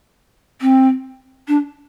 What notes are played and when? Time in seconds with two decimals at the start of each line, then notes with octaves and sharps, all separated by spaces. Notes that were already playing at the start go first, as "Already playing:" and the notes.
0.61 C4
1.48 D4